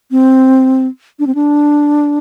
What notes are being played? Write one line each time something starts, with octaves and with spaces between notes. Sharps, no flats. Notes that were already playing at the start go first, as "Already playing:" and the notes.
C4
D4
C4
D4